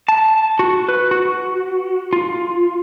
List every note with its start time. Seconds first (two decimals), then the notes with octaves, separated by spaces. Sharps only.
0.09 A5
0.59 F#4
0.89 B4
1.11 F#4
2.13 F4